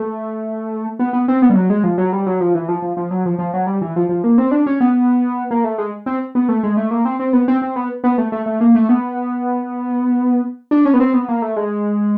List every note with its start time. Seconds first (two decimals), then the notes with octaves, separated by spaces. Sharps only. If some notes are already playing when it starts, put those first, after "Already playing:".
Already playing: A3
0.99 B3
1.13 B3
1.28 C4
1.42 B3
1.50 G3
1.56 F#3
1.70 G#3
1.84 F3
1.98 F#3
2.12 G3
2.26 F#3
2.40 F3
2.55 E3
2.68 F3
2.82 F3
2.97 F3
3.11 F#3
3.26 F3
3.39 F3
3.54 F#3
3.67 G3
3.81 E3
3.96 F3
4.09 F3
4.24 A#3
4.38 C4
4.51 D4
4.66 C#4
4.80 B3
5.51 A#3
5.64 A3
5.78 G#3
6.06 C4
6.35 B3
6.49 A3
6.63 G#3
6.77 A3
6.91 A#3
7.05 C4
7.20 C4
7.33 B3
7.48 C4
7.62 C4
7.76 B3
8.04 B3
8.18 A3
8.32 A3
8.46 A3
8.61 A#3
8.75 A3
8.89 B3
10.71 D4
10.85 C#4
10.94 B3
11.00 C4
11.14 B3
11.29 A#3
11.42 A3
11.56 G#3